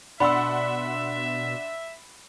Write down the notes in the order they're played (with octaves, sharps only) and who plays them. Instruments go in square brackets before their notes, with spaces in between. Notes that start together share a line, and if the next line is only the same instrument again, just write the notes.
[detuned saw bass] B2 [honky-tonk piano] D4 F#5 C6 [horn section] E5 [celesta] B5 E6